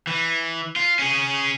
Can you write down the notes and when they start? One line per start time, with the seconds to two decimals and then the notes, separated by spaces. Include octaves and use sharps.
0.07 E3
0.76 F4
0.99 C#4 G#4